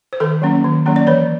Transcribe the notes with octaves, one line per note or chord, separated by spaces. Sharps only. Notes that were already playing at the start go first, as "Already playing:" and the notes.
C5
D#3 A4 B4
F#3 A#3 C#4
D#3
F#3 A#3 C#4
D5
E3 B4 C#5